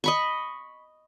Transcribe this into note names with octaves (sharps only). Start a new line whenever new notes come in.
D#5 B5 C#6